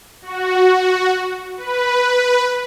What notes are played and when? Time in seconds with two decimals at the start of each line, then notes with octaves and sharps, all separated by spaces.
0.22 F#4
1.57 B4